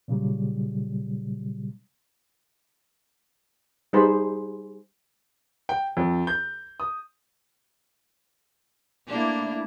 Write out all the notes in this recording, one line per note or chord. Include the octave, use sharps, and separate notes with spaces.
A#2 C#3 F#3 G3
G3 D#4 G#4 C5 B5
G5
F2
G6
D#6
A3 A#3 D4 E4